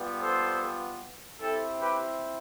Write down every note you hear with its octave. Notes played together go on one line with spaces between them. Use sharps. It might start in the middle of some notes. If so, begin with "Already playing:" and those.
Already playing: G3 B3 F4
A4 C5
C4 E4 G4 A4
G4 B4